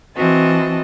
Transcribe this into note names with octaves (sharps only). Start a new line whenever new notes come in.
E3 C4 F#4 D#5 A5